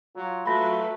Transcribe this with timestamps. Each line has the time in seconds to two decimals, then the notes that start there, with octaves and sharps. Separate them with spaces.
0.16 F#3 F4
0.46 F#3 A3 B4 B5 A#6